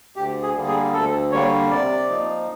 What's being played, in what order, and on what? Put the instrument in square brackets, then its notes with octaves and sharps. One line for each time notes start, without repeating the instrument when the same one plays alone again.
[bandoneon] D2 G4
G#4
D3 G3 A#3
G#4
D2 A4
D3 G3 A#3 C#5
C3 D5
F3 A#3 D#4